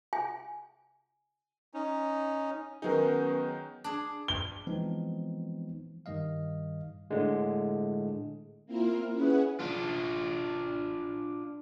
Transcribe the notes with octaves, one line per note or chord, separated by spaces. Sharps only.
G#5
C#4 D#4
D#3 F#3 B3 C#4 D#4 G#4 A#4
D4 G#4
G7
E3 F3 G#3 B3 C4 D#4
G2 D#3 G3 D#5 F5
A2 D3 G#3
A#3 C4 E4 F4 A#4
C#4 E4 G#4 B4 F#5
D4 F4